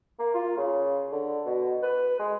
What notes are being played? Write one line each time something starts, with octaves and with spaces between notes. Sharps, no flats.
A#3
F4
C#3
D3
B2
B4
G#3